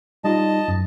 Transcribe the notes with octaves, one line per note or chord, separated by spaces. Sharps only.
G3 D#4 F4 D#5 A5
F#2